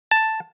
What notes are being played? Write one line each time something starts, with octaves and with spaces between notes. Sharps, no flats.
A5